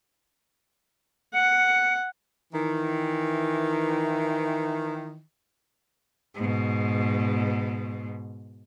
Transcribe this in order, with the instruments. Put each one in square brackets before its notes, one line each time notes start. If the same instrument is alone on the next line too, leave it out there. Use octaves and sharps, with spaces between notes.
[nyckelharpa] F#5 [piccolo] C#7
[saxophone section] D#3 E3
[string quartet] G#2 B2